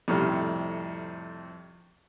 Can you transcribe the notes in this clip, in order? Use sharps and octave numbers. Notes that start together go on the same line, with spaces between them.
F2 A2 C3 G3 F6